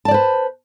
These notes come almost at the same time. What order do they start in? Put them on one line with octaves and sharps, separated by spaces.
A5 D5 C5 B4